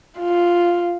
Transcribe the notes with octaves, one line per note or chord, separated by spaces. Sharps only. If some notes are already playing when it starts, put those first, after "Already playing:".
F4